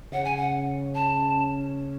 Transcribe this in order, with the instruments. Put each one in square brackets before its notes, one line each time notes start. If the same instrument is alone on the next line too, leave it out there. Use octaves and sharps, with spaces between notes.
[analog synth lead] C#3 [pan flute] F#5
[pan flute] G#5
F#5
A5